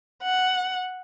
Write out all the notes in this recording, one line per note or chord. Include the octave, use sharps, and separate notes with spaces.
F#5